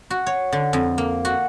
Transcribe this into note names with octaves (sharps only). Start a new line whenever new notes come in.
F#4
C#5
D3
F2
A#3
F#4